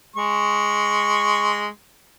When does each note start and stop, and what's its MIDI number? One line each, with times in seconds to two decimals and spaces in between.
0.16 1.67 56
0.16 1.67 85